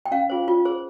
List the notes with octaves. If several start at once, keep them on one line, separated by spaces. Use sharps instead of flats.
G5
C#4 F5
F4 G#4 C5
F4
G#4 C5